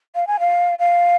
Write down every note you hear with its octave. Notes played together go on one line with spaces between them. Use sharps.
F5
G#5
F5
F5